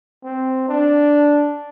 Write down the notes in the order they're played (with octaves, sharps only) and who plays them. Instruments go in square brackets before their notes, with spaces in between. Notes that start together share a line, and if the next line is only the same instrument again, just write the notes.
[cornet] C4
D4